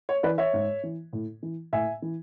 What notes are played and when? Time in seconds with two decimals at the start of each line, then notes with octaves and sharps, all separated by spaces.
0.09 C#5
0.23 E3 B4 D5
0.38 C#5 E5
0.53 G#2
0.83 E3
1.13 A2
1.43 E3
1.73 A2 E5 G#5
2.02 E3